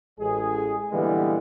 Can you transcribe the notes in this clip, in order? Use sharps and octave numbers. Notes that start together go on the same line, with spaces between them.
A1 G#3 G#4
A#2 D3 E3 G3 G#3 B3